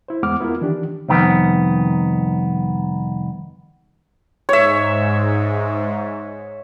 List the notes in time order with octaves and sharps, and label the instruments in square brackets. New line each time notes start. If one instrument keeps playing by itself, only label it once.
[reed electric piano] E4 C5
E2 G#3 B3 F#5 D6 F6
B3 E4 F4 A#4
D#3 E3 D4 G4
[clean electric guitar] C2 F2 D#3 B3
[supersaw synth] G#2 [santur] C#5 E5